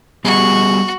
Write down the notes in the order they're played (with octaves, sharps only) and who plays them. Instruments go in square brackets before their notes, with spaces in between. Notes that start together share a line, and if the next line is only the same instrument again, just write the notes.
[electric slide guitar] G3 B3 G#4 [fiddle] F#4